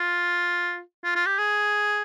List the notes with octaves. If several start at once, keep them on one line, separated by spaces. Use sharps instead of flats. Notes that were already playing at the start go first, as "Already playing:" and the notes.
Already playing: F4
F4
F4
G4
G#4